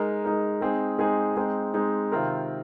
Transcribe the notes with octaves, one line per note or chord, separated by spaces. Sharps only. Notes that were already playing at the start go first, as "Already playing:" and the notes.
Already playing: G#3 D#4 A#4
G#3 D#4 A#4
G#3 C4 D#4 G#4
G#3 C4 D#4 G#4
G#3 C4 D#4
G#3 C4 D#4
C3 D#3 C4 F4 A#4